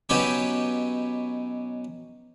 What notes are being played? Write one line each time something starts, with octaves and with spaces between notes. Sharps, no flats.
B2 F#3 B3 C#4 D#4 G4